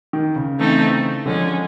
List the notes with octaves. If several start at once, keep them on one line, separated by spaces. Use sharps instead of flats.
D#3
C#3
E3 A3 C4 D#4
D3 F3 G#3 C#4